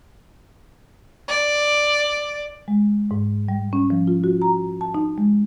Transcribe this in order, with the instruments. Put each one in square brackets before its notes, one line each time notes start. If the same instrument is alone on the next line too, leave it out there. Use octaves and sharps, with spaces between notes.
[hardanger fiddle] D5
[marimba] G#3
G#2
G3
C#4
F3
F4
F#4
A#5
A5
D#4
G#3